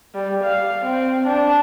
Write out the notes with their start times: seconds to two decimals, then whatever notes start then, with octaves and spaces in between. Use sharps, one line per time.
0.15 G3
0.44 F5
0.85 C4
1.27 D4